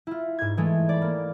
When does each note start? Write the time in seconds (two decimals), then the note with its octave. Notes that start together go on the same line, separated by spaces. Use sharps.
0.07 E4 F4
0.39 G#2 G#6
0.57 E3 G#3 A3
0.89 D5 B5
1.02 A#3